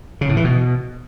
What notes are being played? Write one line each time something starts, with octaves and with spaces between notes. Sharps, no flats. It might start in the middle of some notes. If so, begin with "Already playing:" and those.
C#3
A2
E3
B2